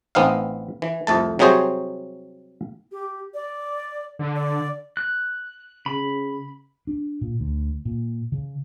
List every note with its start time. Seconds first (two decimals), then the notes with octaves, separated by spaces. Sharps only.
0.15 A1 B3 C4 D#4 F5
0.82 E3
1.07 C2 F2 A3 A5
1.39 C3 F#3 G3 G#4 C5 C#5
2.92 G4
3.34 D5
4.19 D3
4.36 D5
4.97 F#6
5.86 C#3 B5
6.87 D4
7.21 A#2
7.40 D2
7.85 A#2
8.32 C#3